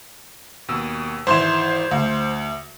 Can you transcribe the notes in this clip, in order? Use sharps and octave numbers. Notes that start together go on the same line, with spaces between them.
D#2 B2 E6
G#1 E3 C5 C6 E7
D2